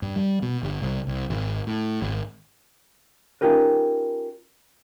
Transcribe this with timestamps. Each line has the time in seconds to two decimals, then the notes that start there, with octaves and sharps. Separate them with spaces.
0.02 G2
0.16 G3
0.42 B2
0.63 G1
0.82 C2
1.07 C2
1.30 G#1
1.67 A2
2.02 G#1
3.41 C#4 D#4 F4 G4 A#4 B4